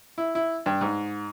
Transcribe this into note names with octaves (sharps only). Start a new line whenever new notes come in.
E4
E4
G2
G#2